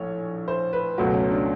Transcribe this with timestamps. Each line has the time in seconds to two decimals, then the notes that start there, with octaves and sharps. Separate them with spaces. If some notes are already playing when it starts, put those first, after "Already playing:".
Already playing: A#1 A2 C#5
0.48 C5
0.73 B4
0.98 C#2 B2 F#3 A3 F#4
1.14 C#4
1.31 D4